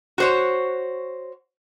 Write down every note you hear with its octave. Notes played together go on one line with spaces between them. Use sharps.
F#4 C5 C#5